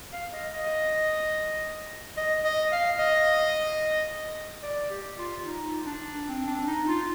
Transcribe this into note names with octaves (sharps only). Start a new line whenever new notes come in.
F5
D#5
D#5
D#5
D#5
F5
D#5
D5
G4
F4
D#4
D4
C4
D4
D#4
F4